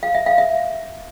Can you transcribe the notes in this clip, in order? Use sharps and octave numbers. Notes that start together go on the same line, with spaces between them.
F5
E5
F5
E5